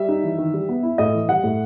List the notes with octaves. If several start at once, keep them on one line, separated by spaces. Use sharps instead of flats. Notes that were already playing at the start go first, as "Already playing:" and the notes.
Already playing: G3 E5
D#4
E3
D#3
G3
B3
E4
A2 D#5
E3
G3 F#5
A2